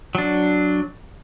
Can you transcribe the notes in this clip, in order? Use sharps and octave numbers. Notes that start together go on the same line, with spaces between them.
F#3 D4